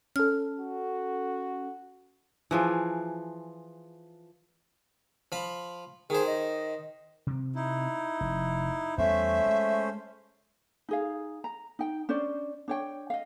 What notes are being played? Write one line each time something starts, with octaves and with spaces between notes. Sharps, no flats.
C#4 A4 F6
F#4
E3 F3 G#4
F3 B5
D#3 G#4 C5
D#5
C3 C4
D#4 E4
F1
E2 G3 A3 B3 C#4 C5 E5
G#3
D#4 G#4 F5
A#5
D#4 G5
C#4 D4 C5 D5
D4 C#5 G5
D#5 F5